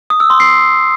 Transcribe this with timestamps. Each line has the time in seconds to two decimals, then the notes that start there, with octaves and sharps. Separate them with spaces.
0.10 D#6
0.20 E6
0.30 C6
0.40 C7